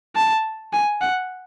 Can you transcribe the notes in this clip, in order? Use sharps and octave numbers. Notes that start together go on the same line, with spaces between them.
A5
G#5
F#5